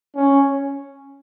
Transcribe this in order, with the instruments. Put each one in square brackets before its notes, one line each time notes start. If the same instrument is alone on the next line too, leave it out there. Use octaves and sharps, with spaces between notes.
[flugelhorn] C#4